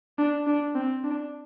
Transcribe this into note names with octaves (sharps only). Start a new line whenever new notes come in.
D4
D4
C4
D4